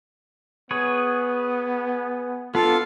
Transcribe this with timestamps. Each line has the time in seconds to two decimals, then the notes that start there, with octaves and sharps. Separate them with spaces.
0.71 B3 G#4 B4 C#5
2.55 B3 D4 F4 A4 F5